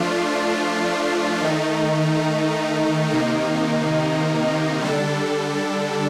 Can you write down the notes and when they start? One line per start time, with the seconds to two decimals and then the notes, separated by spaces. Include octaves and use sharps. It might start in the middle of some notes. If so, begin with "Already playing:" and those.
Already playing: F3 A3 D4 F4
1.41 D#3 A3 D#4
3.10 C3 D#3 A#3 D#4
4.81 D3 G3 D4 A4